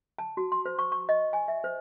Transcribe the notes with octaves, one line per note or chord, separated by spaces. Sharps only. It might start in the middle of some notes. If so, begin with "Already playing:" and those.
A5
F#4
C6
C5
C#6
C#6
D#5
G#5
E5
C5